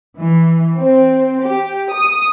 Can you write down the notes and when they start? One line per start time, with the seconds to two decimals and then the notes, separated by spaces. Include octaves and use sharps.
0.18 E3
0.80 C4
1.45 G4
1.94 D#6